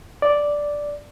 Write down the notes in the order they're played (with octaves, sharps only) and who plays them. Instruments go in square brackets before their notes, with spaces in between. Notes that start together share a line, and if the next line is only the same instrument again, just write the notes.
[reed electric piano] D5